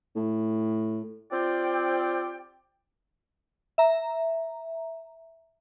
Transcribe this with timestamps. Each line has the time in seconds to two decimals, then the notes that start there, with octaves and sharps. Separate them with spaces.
0.16 A2
1.31 C4 F4 G4 D5 G5
3.78 E5 A#5